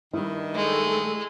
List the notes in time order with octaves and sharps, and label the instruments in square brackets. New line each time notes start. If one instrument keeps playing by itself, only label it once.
[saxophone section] G2 D#3 [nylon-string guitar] G3 E4
[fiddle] G#3 [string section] A3